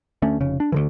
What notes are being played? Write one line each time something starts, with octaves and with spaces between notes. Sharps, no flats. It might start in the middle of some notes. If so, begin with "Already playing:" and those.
D2 A3 C#4
F1 C#3
D4
D2 D3 E3